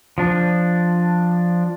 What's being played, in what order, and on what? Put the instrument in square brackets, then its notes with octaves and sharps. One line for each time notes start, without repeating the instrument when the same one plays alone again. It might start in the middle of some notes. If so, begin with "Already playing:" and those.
[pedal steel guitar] F3 D4